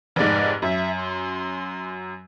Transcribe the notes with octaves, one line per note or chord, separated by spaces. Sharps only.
F1 G#2 D5
F#2 E5
C6